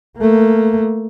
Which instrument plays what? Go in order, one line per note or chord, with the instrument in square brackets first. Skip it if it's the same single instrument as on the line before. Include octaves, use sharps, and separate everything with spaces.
[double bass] A3 A#3